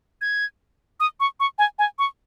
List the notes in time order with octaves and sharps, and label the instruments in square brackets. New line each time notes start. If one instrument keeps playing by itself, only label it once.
[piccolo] G#6
D#6
C#6
C#6
G#5
G#5
C#6